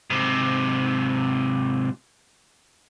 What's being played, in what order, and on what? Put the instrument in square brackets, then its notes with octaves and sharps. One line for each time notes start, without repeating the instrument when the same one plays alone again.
[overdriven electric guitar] G#2 C3